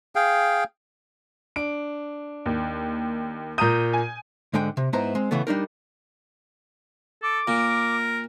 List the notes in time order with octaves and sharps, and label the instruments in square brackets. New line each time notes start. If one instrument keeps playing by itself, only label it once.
[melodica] G#4 F5 G5
[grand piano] D4 D7
[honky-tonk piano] D#2
[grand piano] A#2 A#5 D#6 [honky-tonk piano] G6 D#7
[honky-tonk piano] G#5
[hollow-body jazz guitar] G#2 D3 G#3 G5
C3
G#2 B3 E4 C5 A#5
G#3 C4
C#3 E3 A3 B3
G3 D4 D#4 A#4
[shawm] A4 [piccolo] D6
[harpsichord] A#2 [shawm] A#4